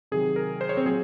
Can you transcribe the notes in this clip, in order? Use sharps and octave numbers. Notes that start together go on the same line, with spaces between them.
C3 D#3 F#3 G#4
A#4
C5
C#5
C4 C5
A#2 F#3 G#4